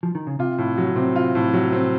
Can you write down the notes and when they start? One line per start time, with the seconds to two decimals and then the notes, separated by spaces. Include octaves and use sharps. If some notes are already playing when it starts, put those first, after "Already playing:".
0.03 F3
0.15 D#3
0.27 C#3
0.39 C3 F4
0.58 A2
0.78 F#3
0.96 C3 C4
1.16 F4
1.35 A2
1.53 F#3
1.73 C4